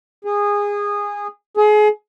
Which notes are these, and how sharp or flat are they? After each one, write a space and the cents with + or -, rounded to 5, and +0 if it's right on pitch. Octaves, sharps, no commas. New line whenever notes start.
G#4 -20
G#4 +30